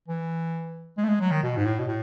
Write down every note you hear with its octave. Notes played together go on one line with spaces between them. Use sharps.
E3
G#3
A3
G#3
F#3
D#3
B2
G#2
A2
B2
A2